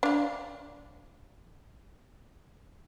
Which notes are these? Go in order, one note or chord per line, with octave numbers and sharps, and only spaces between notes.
D4 F5